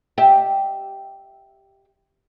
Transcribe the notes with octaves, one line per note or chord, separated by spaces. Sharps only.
G4 E5